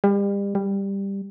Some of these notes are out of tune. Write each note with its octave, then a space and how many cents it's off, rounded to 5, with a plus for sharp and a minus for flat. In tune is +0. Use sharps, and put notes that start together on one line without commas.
G3 +35
G3 +10